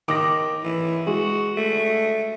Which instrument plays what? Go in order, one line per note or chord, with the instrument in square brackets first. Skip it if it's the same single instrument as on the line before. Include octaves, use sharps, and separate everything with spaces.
[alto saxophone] D#3 [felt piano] D6 A#6
[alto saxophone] E3
[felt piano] G#3 [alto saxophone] F#4
[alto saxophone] A3